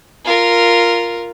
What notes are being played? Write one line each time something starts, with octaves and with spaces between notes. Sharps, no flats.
F4 A#4